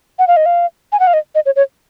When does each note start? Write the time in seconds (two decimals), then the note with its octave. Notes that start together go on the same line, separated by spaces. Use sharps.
0.19 F#5
0.27 F5
0.37 D#5
0.46 F5
0.92 G#5
1.00 F#5
1.07 F5
1.14 D#5
1.35 D#5
1.46 C#5
1.56 C#5